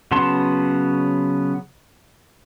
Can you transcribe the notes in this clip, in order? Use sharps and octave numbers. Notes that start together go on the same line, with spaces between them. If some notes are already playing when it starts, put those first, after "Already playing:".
C#3 F#3 B3 A5 C6